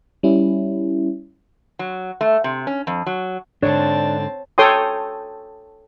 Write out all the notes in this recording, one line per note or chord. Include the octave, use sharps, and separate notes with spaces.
G3 C#4 E4
F#3
A3
C3
C#4
F2
F#3
G#2 D3 C4 D4 C#5 A5
A4 C#5 G5 C6 D#6